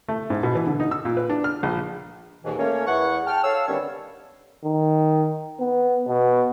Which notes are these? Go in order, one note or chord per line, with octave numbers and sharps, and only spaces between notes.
A3
G#2
B2
E3
D3
D#4
E6
A#2
B4
D4
F6
A#1
D#2 G#2 B2 E3
A3 A#3 C#4 C#5
E2 E3 F#5 C#6
G5 A5 F6
A4 C#5 F5 E6
D3 D#3 G3 B3 C#4 C#5
D#3
B3
B2